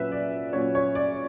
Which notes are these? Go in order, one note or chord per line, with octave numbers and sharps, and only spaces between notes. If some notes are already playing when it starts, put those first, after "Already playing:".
Already playing: A#2 F#3 C#4 B4 E5
D5
A#2 F#3 C#4 C#5
C#5
D5